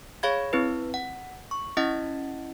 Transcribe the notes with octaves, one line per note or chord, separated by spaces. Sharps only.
G#4 C#5 F5 B5 G#6
C4 E4 B4
F#5
C#6
C#4 E4 D#5 F#5 A6